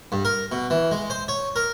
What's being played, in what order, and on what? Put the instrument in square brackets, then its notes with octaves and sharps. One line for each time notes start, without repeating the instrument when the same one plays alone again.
[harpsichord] G2
A#4
B2
E3
G#3
C5
C#5
A#4